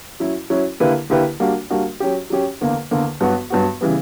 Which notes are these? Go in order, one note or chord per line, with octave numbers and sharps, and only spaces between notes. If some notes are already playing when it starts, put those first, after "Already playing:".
F#3 C#4 E4
F#3 C#4 E4
D3 A#3 E4 G4 B4
D3 A#3 E4 G4 B4
G3 A#3 D4 F#4
G3 A#3 D4 F#4
F#3 C#4 G4
F#3 C#4 G4
E2 D3 A#3
E2 D3 A#3
G2 F#3 B3 F#4
G2 F#3 B3 F#4
C#3 E3 G3 B3